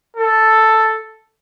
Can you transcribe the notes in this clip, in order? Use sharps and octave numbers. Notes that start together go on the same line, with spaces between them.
A4